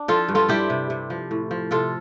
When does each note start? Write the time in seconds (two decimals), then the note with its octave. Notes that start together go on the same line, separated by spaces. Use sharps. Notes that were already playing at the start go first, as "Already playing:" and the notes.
Already playing: D4
0.08 F3 F4 A4
0.28 G2
0.35 F4 A4
0.49 G3 E4 G4
0.70 C3
0.90 C3
1.10 F3
1.31 A2
1.51 F3
1.71 C3 F4 A4